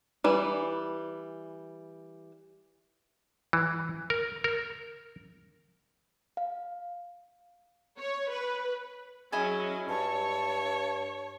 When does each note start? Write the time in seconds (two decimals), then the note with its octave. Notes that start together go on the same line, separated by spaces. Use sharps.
0.24 E3 G3
3.53 E3
4.10 A#4
4.44 A#4
6.37 F5
7.99 C#5
8.31 B4
9.33 F#3 C#4 E4 G#4 D#5 G#5
9.89 G2 C#5 A5